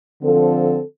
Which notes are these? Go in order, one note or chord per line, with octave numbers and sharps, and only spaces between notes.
D3 F3 C4 A4